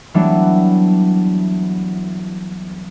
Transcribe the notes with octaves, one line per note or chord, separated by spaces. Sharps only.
E3 F#3 G3 A3 B3 D4